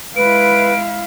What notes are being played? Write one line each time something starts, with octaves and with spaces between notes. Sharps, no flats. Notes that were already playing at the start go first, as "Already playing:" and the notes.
G#3 E4 B4 F5 D7